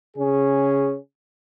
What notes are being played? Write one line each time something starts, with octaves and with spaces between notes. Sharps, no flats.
C#3 C#4 G#4